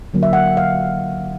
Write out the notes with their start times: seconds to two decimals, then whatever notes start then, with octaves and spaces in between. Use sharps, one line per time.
0.14 D3 F#3 A#3
0.23 E5
0.33 F#5
0.57 F5